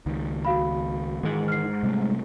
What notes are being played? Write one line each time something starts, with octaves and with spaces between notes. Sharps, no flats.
C#2 D#3
F#4 F5 B5
G#2 D#3 E3 G#3
F6 C7
C3 G3 A3